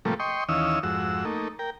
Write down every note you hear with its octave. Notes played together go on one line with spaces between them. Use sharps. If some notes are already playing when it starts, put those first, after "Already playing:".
A2 C3 F3 G3 A3 A#3
D#5 G5 C6 C#6
D#2 E3 C#4 D#5 F5 E6
F2 G#2 F#4 E6
A3 A#3 D#4
A#4 G5